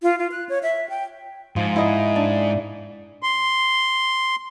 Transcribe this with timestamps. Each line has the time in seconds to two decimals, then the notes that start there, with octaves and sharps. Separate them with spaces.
0.03 F4
0.19 F4
0.32 F#6
0.49 C#5
0.63 E5
0.89 G5
1.56 G#2 F3
1.76 E4 D#5
2.16 D4
3.23 C6